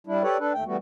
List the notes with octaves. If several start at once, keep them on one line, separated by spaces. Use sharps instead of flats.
G3 D4 E4
G4 A4 B4 C#5 D5
D4 A4 B4
D#2 A3 G5
E3 G3 A3 B3 F#4